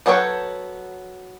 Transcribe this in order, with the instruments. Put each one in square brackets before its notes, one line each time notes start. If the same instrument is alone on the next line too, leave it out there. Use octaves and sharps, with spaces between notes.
[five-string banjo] F#3 B3 A4 C#5 G5